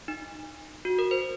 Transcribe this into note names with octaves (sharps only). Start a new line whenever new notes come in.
D#4
F#4
A#4
C5